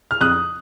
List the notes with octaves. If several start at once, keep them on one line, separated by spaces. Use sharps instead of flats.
F6
F2 D#6 F#6